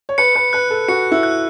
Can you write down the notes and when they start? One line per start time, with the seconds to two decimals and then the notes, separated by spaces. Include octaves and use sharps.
0.09 C#5
0.18 B4 C#7
0.36 B4
0.53 B4 F#6
0.70 A4
0.88 F#4 C#7
1.12 E4
1.23 F#6